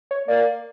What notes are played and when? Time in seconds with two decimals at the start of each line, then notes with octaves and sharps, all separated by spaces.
0.11 C#5
0.28 A#3 D5